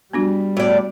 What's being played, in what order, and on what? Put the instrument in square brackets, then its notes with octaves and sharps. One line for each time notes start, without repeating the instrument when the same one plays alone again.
[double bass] G3 [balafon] B3 D4 F#4
[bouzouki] A2 D5 [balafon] B3 F#4